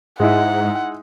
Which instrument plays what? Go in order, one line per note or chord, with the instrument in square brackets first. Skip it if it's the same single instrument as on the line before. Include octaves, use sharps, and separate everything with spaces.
[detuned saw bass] G#2 [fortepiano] G#3 D#4 E4 [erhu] F#5